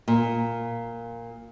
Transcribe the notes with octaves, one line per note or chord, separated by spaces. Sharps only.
A#2